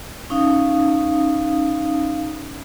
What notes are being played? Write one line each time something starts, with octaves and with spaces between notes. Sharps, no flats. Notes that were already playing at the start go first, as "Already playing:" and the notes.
C#4 D#4 F5 D#6